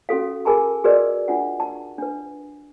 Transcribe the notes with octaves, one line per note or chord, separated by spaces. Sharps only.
C#4 F#4 A4 F5
G#4 A#4 G#5 A5 B5
F#4 G#4 A#4 B4 D5 D#5
D4 F4 F#5
A5
D4 B4